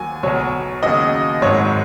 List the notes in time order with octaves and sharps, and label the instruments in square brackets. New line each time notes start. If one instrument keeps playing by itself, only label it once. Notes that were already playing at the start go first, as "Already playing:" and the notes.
Already playing: [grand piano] D#2 F#3 G#5
B1 B2 F#3 C#5
D#2 C#3 F#3 D#5
G#1 G#2 F#3 C#5